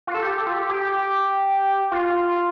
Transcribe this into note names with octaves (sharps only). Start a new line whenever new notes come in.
F4
A4
G4
A4
F4
G4
G4
F4